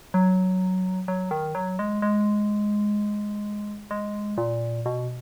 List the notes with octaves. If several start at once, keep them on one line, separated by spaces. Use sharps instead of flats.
F#3
F#3
D#3
F#3
G#3
G#3
G#3
A#2
B2